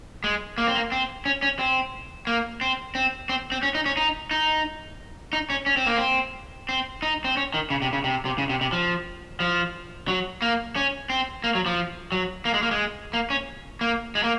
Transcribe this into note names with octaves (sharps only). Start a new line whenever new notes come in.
G#3
A#3
C4
A#3
C4
C#4
C#4
C4
A#3
C4
C4
C4
C4
C#4
D#4
C#4
D#4
D#4
D#4
C#4
C#4
C4
A#3
C4
C4
D#4
C4
C#4
D#3
C#3
C3
C#3
C3
C3
C#3
C3
C3
F3
F3
F#3
A#3
C#4
C4
A#3
F#3
F3
F#3
A#3
G#3
A#3
G#3
A#3
C#4
A#3
G#3
A#3